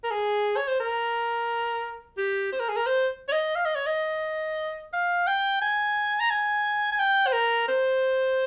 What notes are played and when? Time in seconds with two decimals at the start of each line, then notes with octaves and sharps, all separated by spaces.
0.04 A#4
0.11 G#4
0.56 C#5
0.67 C5
0.80 A#4
2.17 G4
2.52 C5
2.60 A#4
2.69 G#4
2.76 A#4
2.86 C5
3.28 C#5
3.32 D#5
3.55 F5
3.65 D#5
3.75 C#5
3.86 D#5
4.93 F5
5.27 G5
5.61 G#5
6.20 A#5
6.30 G#5
6.92 G#5
6.99 G5
7.27 C5
7.33 A#4
7.68 C5